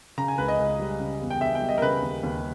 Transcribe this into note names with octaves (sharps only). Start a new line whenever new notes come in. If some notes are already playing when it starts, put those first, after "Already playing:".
C#3 A#5
G#5
C#2 B4
D#5
C#2
G3
C#3
E2
G5
E2 E5
G5
G3
D#5
A#4
C#3 B4
D#2
D#2